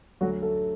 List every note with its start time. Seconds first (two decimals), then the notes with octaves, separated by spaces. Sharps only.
0.21 D2 D3 F#3 A3 F#4
0.42 A3 A4